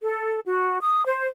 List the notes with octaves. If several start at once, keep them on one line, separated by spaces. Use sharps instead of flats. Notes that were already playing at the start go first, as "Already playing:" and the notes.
A4
F#4
D#6
C5